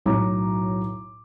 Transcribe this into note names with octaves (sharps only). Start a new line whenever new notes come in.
B1 A2 F#3 C#5 A#5 D6